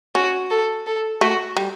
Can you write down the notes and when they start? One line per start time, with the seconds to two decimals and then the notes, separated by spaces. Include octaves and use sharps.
0.15 C#4 F#4
0.50 A4
0.87 A4
1.21 A3 F#4
1.57 G3